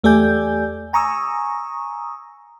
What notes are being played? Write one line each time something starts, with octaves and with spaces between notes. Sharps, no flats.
E2 A3 G4 D5 G#5 G6
G#5 A#5 C#6 D#6 E6